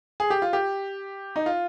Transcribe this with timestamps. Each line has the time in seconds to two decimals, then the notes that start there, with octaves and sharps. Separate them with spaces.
0.20 G#4
0.30 G4
0.42 F4
0.53 G4
1.36 D#4
1.46 F4